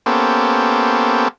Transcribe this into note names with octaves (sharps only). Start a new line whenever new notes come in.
A#3 B3 C#4 G4 A4 C5